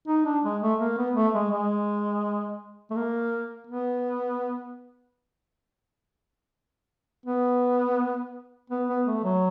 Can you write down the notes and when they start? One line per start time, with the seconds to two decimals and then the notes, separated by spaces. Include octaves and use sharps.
0.08 D#4
0.25 D4
0.44 G#3
0.62 A3
0.80 A#3
0.98 B3
1.16 A3
1.34 G#3
1.51 G#3
2.91 A3
2.96 A#3
3.67 B3
7.26 B3
8.70 B3
8.88 B3
9.06 A3
9.24 F#3